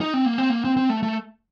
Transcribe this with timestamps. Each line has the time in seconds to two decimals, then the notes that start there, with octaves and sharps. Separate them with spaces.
0.01 D#4
0.14 C4
0.26 A#3
0.38 C4
0.50 A#3
0.64 C4
0.77 C4
0.89 A3
1.03 A3